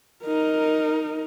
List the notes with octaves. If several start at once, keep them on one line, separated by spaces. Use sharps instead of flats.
D#4 A#4